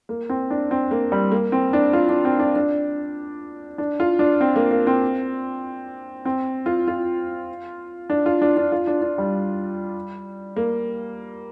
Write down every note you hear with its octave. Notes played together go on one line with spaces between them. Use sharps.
A#3
C4
D4
C4
A#3
G3
A#3
C4
D4
F4
D4
C4
D4
D4
D4
F4
D4
C4
A#3
A#3
C4
C4
F4
F4
D4
F4
D4
D4
F4
D4
D4
G3
A#3